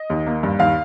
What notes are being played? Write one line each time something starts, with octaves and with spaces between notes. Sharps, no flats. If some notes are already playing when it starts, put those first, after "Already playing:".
Already playing: D#5
D#2
A#3
G2
D#2 F5